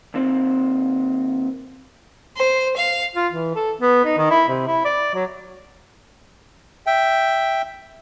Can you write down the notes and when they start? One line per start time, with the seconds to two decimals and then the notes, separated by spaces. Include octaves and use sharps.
0.14 D#2 C4
2.37 C5
2.76 F5
3.16 F4
3.32 E3
3.55 A4
3.81 B3
4.05 D#4
4.18 D#3
4.30 E4
4.49 C3
4.67 E4
4.85 D5
5.15 F#3
6.87 E5 G5